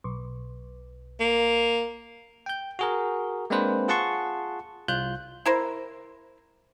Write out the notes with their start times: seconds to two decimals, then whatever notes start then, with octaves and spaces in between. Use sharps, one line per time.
0.04 B1
1.20 A#3
2.46 G5 G6
2.79 F#4 G#4 A#4
3.50 G#3 A#3 C4 D4 B4 C5
3.88 F4 G#4 F#5 A5 C6 C#6
4.88 C2 F4 F#6 G6
5.45 E4 A#4 C5